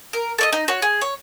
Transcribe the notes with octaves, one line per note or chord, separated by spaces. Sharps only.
A#4
A4 D5 D#5
D#4
F#4 C#5
G#4
C#5